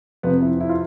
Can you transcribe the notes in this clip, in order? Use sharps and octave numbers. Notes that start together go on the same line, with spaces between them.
F2 C3 F3 B3
E4
E4
F4